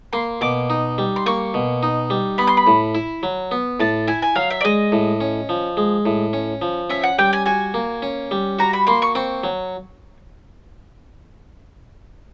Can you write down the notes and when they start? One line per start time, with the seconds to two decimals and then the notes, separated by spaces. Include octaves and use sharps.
0.13 A#3 C6
0.41 B2 D6
0.70 D#4
0.98 G3
1.16 C6
1.26 A#3 C#6
1.54 B2
1.83 D#4
2.10 G3
2.38 B3 B5
2.47 C6
2.57 B5
2.67 A2
2.95 E4
3.23 F#3
3.51 B3
3.80 A2 A5
4.08 E4 G#5
4.22 G#5
4.35 F#3 F5
4.50 E5
4.61 D5
4.64 G#3 D#5
4.92 A2
5.21 C#4
5.49 F3
5.77 G#3
6.06 A2
6.33 C#4
6.62 F3
6.90 C#4 E5
7.03 F#5
7.19 G3 G5
7.33 G#5
7.46 F#4 G#5
7.74 A#3
8.02 C#4
8.31 G3
8.59 F#4 A#5
8.73 B5
8.87 A#3 C6
9.02 C#6
9.15 C4 C#6
9.44 F#3